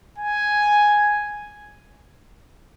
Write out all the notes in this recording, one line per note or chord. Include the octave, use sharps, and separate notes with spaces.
G#5